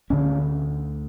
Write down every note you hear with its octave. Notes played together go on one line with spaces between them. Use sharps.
D2 D3 C#4